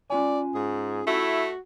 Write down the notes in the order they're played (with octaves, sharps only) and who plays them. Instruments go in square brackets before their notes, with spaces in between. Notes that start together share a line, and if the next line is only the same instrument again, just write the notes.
[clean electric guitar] C#4 F4 G#5 [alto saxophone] D5
[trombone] G#2 [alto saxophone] G#4
[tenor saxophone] A3 [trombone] E4 [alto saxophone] F#4